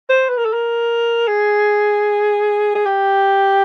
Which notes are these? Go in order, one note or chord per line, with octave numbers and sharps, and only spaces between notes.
C5
B4
A#4
A4
A#4
G#4
G#4
G4